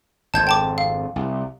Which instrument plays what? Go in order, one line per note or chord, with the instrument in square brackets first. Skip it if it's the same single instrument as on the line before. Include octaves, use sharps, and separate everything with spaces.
[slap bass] G#1 F2 [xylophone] A5 G6 G#6
[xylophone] G5 A5 D6
F5
[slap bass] C2